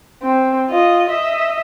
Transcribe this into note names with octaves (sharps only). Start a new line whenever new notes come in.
C4
F4 D#5
D#5 E5